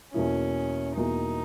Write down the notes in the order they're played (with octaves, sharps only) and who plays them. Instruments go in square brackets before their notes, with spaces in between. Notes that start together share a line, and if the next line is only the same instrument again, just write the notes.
[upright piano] E2 B2 A#3 E4 [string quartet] C#4
[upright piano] E2 B2 A#3 E4 [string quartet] D#4